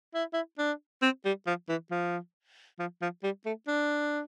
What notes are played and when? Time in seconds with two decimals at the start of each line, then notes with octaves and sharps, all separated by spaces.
0.14 E4
0.33 E4
0.59 D4
1.02 C4
1.25 G3
1.47 F3
1.69 E3
1.91 F3
2.79 F3
3.01 F3
3.23 G3
3.46 A3
3.68 D4